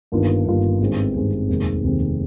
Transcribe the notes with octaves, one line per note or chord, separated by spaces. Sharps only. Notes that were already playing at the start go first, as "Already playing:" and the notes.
G1 G2 D#3 A#3 F4
G1 G2 D#3 A#3 F4
G#1 G2 D#3 G#3 C4
G#1 G2 D#3 G#3 C4
F1 D#2 D#3 G#3 C4
F1 D#2 D#3 G#3 C4